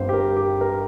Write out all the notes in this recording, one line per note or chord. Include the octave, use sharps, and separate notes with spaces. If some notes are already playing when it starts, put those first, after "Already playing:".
Already playing: G1 G2 G3 C4 C5
G4
A#4
G4
A#4